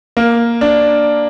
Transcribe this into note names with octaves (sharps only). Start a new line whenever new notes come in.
A#3
D4